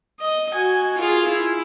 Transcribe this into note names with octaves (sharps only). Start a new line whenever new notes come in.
D#5
F#4 G#5
F4 G#4
E4